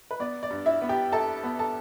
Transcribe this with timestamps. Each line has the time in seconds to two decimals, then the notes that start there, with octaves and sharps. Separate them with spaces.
0.11 B4
0.20 B3 D5
0.43 D5
0.50 G2
0.66 E4 E5
0.82 B3
0.89 G4 G5
1.12 E4 A4 A5
1.44 B3
1.59 A4 A5